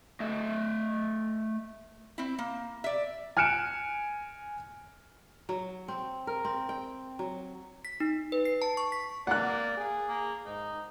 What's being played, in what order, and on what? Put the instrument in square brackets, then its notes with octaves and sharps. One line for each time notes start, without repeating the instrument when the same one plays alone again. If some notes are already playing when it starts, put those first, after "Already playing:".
[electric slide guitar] A3 D#5 E5
[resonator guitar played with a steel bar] C4 E4
A#3
D5 E5
[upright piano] G#5 F6 F#6 C#7 D7 E7
[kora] F#3
C4
A#4
C4
G5
F#3
[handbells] B6
D#4
B4
C7
A5
C#6
B6
[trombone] A#3 [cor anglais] D5 [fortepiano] F#5 F#6
[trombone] G#4
[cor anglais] A#3
[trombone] G#2 [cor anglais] D#4